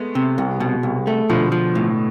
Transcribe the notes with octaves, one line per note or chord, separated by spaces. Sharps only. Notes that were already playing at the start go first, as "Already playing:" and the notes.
Already playing: G#3 A3 B3
C3
C2
B2
C2
A3
B2 D3 F3
F3
A2